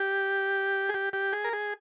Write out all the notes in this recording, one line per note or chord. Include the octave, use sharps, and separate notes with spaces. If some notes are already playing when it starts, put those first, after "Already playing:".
Already playing: G4
G#4
G4
G4
G#4
A#4
G#4